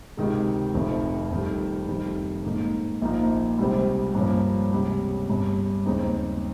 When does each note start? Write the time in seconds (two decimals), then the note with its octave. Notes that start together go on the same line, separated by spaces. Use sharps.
0.17 C#2 C3 D#3 G#3
0.74 F1 F2 D#3
1.31 F2 D#3 G3
1.88 F1 F2 D#3 G3
2.44 G#2 D#3 A#3 D#4
3.02 A#1 A#2 F3 A#3 D#4
3.58 C#2 C3 G3 C4
4.15 G2 F3 A#3 C#4
4.72 C#2 C3 G3 C#4
5.28 G1 G2 G3 C#4
5.86 D#2 C#3 G#3 C4 D#4